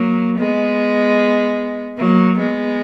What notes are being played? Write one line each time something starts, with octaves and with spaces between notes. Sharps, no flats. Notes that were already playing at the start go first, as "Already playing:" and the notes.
Already playing: F#3 A#3
G#3 B3
F#3 A#3
G#3 B3